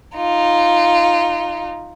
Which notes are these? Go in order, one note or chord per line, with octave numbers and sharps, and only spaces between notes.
D#4 F4